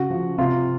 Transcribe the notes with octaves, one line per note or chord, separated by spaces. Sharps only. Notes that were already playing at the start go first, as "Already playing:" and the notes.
Already playing: C#3 F#4
F3
C3 F4